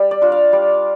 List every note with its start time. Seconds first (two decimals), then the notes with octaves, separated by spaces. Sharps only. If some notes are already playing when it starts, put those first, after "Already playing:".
Already playing: G3
0.11 D5
0.21 D4 F4
0.32 F5
0.53 G3